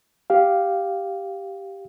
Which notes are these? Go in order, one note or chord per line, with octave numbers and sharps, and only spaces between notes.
G4 F5